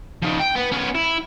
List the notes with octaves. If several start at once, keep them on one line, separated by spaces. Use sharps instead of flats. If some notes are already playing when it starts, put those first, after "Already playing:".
F3 D#4
G5
B3 B4
B3 C#4
E4